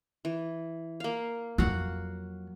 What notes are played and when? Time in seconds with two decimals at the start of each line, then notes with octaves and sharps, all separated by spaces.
0.25 E3
1.00 A#3 F5
1.58 F2 F#3 F#4 F5 F#5